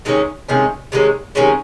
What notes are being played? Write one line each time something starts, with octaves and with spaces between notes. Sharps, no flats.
C3 D#3 G#3 C#4
C3 D#3 G#3 C#4
C3 D#3 G#3 C#4
C3 D#3 G#3 C#4